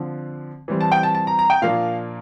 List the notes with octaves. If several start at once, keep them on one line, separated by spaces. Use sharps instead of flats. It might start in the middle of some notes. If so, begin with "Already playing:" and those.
Already playing: D3 F3 C4
E3 G3 C4
A5
G5
A5
A5
A#5
A#5
G5
A#2 F3 A#3 D4 F5